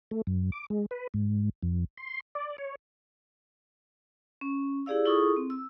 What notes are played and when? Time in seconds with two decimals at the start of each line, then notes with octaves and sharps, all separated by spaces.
0.11 A3
0.27 F#2
0.52 D6
0.70 G#3
0.91 B4
1.14 G#2
1.63 F2
1.97 C6
2.35 D5
2.58 C#5
4.41 C#4
4.86 E4 G4 G#4 D5 F5 E6
5.05 E4 F4 G#4 A4 C#6 D#6
5.36 C4
5.50 E6